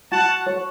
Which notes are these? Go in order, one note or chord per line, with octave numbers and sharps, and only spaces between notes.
F#4 F#5 A5
C#5